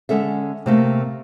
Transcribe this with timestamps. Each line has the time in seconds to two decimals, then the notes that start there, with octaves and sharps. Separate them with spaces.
0.09 D3 G#3 C#4 A4 E5
0.66 C3 A3 A#3